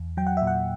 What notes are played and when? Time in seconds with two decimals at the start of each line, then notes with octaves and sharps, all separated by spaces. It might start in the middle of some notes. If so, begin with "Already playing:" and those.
Already playing: E2
0.17 F#3 G5
0.27 F#5
0.37 E5
0.42 A#2
0.47 F#5